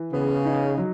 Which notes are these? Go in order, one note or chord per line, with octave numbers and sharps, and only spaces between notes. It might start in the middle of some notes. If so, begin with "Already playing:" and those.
Already playing: E3
C#3 B3
D#4
F#3